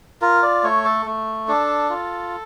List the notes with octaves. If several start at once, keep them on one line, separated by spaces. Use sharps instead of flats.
F4 A#4
D5
A3 C#5
A4
A3
D4 A4
F4